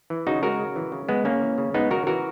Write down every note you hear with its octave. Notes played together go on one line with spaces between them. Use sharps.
E3
C#3 D#4 F#4
G#3 F#4 A#4
C#3
E3
C#3
G#3 B3
C#3 A#3 C#4
E3
C#3
G#3 B3 D#4
C#3 F#4 A#4
E3 F#4 A#4